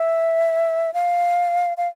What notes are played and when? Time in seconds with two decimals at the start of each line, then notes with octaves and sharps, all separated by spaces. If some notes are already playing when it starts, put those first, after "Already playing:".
Already playing: E5
0.94 F5
1.77 F5